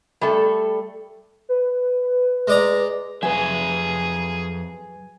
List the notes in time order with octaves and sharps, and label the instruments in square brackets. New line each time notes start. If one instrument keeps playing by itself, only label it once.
[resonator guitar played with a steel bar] G3 A3 A4
[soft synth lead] B4
[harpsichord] G#3 D5 A#5
[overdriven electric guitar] F2 E5 [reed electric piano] F#3 B4 [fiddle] G#4 [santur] G#5